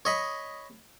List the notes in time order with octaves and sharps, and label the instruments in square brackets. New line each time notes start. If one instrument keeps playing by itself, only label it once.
[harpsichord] C#5 D#5 B5